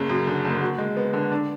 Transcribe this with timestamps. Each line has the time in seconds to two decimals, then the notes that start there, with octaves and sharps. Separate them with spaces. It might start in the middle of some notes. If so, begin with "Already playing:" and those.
Already playing: F#1 C#3
0.09 F#2
0.27 D3
0.45 F#1
0.61 F#4
0.78 G#3
0.97 B3
1.13 D3
1.32 D4